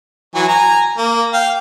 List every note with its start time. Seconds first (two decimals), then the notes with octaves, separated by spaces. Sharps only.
0.35 E3 F#3 G#5
0.48 G#5 A#5
0.98 A#3
1.34 F5 G5